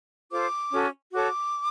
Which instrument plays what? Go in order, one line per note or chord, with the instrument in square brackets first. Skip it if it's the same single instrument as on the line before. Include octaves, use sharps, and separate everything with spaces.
[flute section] F4 A4 C5 D6
C#4 F#4 A4
F#4 A4 C#5 D6